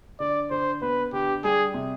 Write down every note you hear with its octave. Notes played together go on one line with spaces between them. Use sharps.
D3 D5
D3 C5
B3 B4
D3 G4
G3 G#4
C3